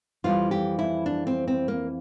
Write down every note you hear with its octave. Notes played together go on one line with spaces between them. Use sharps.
F2 E3 G3 F4
G4
E4
D4
C4
C4
A#3